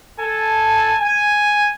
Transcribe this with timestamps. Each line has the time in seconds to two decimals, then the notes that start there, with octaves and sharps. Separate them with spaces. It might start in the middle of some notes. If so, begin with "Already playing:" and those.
0.20 A4 G#5 A5
0.99 G#5